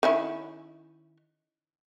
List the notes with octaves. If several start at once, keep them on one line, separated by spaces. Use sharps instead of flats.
D#3 C#4 E4